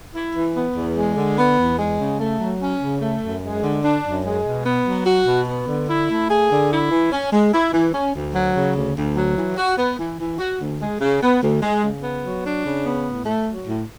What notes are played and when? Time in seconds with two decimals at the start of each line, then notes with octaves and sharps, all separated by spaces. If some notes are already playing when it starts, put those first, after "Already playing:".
0.15 E4
0.35 E3
0.56 B3
0.76 E2
0.97 G#3
1.16 D3
1.38 B3
1.58 E2
1.78 G#3
1.99 C#3
2.19 A3
2.40 F#3
2.61 C#4
2.81 C#3
3.01 A3
3.23 F#2
3.43 G#3
3.62 D3
3.83 D4
4.04 F#2
4.24 G#3
4.45 B2
4.65 B3
4.86 F#3
5.06 F#4
5.27 B2
5.48 B3
5.67 D3
5.88 E4
6.09 A3
6.29 G#4
6.50 D3
6.71 E4
6.90 E3
7.12 C#4
7.31 G#3
7.52 E4
7.73 E3
7.93 C#4
8.14 D2
8.34 F#3
8.55 C#3
8.75 D2
8.96 D2
9.16 F#3
9.37 E3
9.57 F#4
9.77 B3
9.99 E3
10.19 E3
10.39 F#4
10.60 D2
10.80 G#3
11.00 C#3
11.22 B3
11.42 D2
11.62 G#3
11.83 C#3
12.02 B3
12.24 F#3
12.44 D4
12.65 C#3
12.84 B3
13.06 A2
13.26 A3
13.47 F#3
13.66 A2